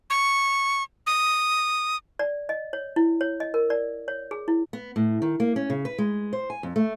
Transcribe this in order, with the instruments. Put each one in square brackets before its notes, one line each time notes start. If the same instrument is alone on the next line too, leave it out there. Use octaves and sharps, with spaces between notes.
[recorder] C#6
D#6
[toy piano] D5
D#5
C#5
E4
C#5
D#5
A#4
D5
C#5
G#4
E4
[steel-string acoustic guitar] B3
A2
D#3
A#3
C#4
C#3
B4
G#3
C5
G#5
F2
A3